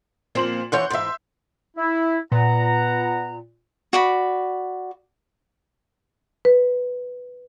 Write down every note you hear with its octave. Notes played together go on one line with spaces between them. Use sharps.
A#2 F3 A#3 C4 C5 F#7
D2 E3 C#5 F#5 C6 G6
G#2 E3 E5 C6
E4
A#2 B3 F#5 A#5
F#4 D5 B5
B4